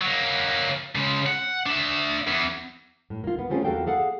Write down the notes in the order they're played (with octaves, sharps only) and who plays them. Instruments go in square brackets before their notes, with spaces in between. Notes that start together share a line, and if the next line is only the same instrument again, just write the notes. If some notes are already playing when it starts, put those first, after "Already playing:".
[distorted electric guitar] F#3 A#3
C#3 G#3
F#5
D4 E5
E2
[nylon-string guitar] A2
A#3 F4
B3
A3 C4 C#4 F4 G#4
E2 A#3 F#4 A4 F5 G5
G#4 A4 F5 F#5